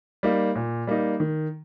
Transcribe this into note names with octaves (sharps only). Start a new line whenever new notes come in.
G3 A#3 D#4
A#2
G3 A#3 D#4
D#3